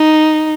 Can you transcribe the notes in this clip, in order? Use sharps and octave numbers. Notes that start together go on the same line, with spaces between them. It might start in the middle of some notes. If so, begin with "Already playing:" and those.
Already playing: D#4